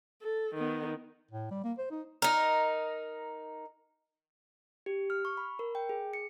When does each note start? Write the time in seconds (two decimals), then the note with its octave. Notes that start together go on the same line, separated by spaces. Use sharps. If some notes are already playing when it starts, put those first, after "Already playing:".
0.22 A4
0.54 D#3 B3
1.31 A2
1.51 G3
1.64 A#3
1.78 C5
1.91 D#4
2.22 D#4 A#4
4.86 G4
5.10 F6
5.25 C#6
5.37 B5
5.59 A#4
5.75 G5
5.89 G#4
6.14 C#7